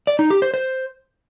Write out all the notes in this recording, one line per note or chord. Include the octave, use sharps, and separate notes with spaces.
D5
D#4
G4
C5
C5